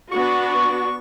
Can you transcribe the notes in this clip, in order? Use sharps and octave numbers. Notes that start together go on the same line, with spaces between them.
B3 D4 F#4 C#6